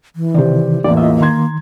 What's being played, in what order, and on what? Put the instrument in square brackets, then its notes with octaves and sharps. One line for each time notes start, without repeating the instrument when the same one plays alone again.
[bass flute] E3
[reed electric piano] C3 D#3 [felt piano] G4 C5 D5
[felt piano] A1 E2 [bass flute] A#3 [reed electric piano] D5
[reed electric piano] F4 D#5 E5
[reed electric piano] D#3 C6 [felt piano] A#5 G#6